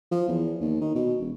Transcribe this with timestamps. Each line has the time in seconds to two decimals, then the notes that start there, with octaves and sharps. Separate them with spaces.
0.12 F3
0.28 E2
0.61 D#2
0.81 D#3
0.95 B2
1.20 E1